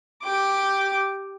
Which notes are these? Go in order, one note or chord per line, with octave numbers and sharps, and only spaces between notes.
G4 D6